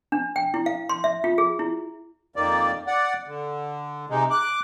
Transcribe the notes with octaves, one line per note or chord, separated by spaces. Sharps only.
D4
G5
E4
F5
C6
E5
F4
G#4
E4
F2 D#3 A#3 D5
D5 F#5
D3
C3 G#3 D#4
D6 F#6